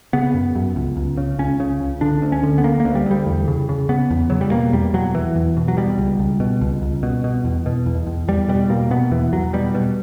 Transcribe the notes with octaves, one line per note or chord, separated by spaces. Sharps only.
C#3 B3
F#2
F#2
C#2
C#2
C#3
C#2 C#4
C#3
C#2
D3 D4
D2
C#4
D3
B3
D3 A#3
A#3
D2
G3
D2 G3
E2
C#3
C#3
C#3 B3
E2
C#3 F#3
G3
B2 A#3
E2 G3
B2 F#3
E2 E3
E2
B2
F#3
B2 G3
C#2
C#2
B2
C#2
C#2
B2
B2
E2
B2
E2
E2
E2 G3
B2 G3
B2 A#3
B2 B3
E2 E3
E2 F#3
B2 G3
B2